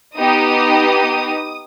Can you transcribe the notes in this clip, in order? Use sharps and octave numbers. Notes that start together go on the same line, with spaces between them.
B3 D#4 G4 D#6